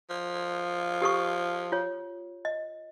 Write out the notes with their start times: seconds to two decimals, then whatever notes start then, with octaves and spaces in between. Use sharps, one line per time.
0.10 F3
1.02 G4 A4 C#6
1.72 F4 C#5
2.45 D#5